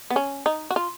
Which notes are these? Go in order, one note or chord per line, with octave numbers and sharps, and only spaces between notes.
B3
C#4
D#4
F#4
F4